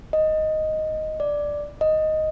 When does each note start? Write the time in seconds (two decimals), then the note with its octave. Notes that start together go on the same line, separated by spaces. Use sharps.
0.13 D#5
1.20 D5
1.81 D#5